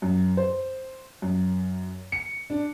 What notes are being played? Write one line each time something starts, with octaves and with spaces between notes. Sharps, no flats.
F#2
C5
F#2
C#7
D4